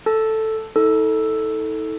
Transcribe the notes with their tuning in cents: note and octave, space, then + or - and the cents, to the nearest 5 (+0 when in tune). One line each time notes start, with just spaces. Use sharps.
A4 +0 A5 +0
D#4 +45 A4 +0